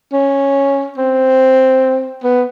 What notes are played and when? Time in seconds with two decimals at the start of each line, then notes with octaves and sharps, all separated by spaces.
0.12 C#4
0.97 C4
2.24 B3